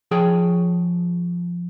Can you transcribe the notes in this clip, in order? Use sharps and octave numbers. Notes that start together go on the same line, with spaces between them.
F3 G#4 C#5 G5